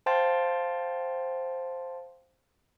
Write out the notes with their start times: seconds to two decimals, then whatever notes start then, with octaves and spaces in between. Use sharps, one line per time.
0.06 C5 F5 G5 A5 C6 A6